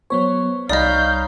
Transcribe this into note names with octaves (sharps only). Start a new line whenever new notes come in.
F#3 B3 C5 C#5
C2 G3 D#4 D5 D#5 F5 B5 G6